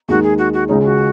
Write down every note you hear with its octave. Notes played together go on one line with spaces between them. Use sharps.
D#2 D#3 G#3 F#4
G#4
F#4
F#4
C#2 C#3 G#3 C#4 D#4
F#4